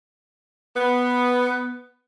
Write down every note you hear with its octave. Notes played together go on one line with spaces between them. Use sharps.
B3